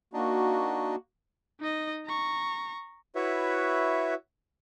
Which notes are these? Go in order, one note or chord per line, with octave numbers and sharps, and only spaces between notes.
A#3 D4 D#4 F#4
D#4 D#5
A#5 C#6
E4 F#4 B4 C#5 E5